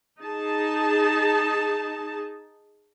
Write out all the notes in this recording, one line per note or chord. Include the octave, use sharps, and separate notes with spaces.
D#4 G#4 A5